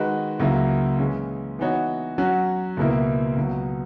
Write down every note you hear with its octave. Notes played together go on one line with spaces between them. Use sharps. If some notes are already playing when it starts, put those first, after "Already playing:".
Already playing: D#3 G#3 D#4 F#4 B4
C#2 C#3 F#3 A#3 E4
C#3 E3 G#3 C#4
E3 B3 D#4 F#4 C#5
F#3 C#4 F#4
C#2 B2 A#3 E4 A#4
C#2 B2 F#3